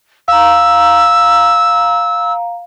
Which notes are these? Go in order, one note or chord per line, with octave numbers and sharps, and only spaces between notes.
F5 A#5 E6